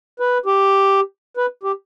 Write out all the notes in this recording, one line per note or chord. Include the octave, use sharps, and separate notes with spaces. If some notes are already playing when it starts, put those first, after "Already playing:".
B4
G4
B4
G4